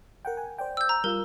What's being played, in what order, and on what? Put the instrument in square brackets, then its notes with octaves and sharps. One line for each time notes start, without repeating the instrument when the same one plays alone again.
[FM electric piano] A#4 F#5 G5
G#5
C5 D5 G5
[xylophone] E6 G6
A#5
[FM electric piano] G3 F4 E6 [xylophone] A#4